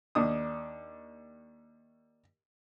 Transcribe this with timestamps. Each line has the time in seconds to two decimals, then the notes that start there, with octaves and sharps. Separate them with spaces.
0.15 D#2 D4 D#6